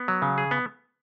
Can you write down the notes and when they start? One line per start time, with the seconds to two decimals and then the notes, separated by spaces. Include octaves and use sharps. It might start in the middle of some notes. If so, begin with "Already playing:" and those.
Already playing: B3
0.08 F#3
0.22 C#3
0.38 G#4
0.51 B3